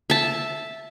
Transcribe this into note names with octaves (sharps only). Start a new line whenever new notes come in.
E5 A5